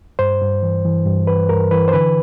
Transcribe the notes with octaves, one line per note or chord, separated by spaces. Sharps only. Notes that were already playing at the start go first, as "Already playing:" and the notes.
G2 C5
G2
E3
E3
G2
E3 B4
G2 A#4
E3 B4
C5
D3 B4